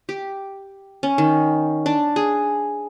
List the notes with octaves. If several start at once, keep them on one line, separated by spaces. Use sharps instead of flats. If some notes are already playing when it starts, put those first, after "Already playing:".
G4
C#4
D#3
D4
G#4